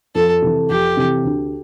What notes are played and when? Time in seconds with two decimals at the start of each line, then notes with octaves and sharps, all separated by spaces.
0.15 F2 A4
0.42 C3 E3
0.70 F2 G4
0.97 C3 E3
1.25 D2